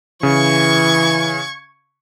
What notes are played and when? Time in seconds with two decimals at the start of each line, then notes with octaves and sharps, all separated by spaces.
0.23 C#3 E3 C#6 G#6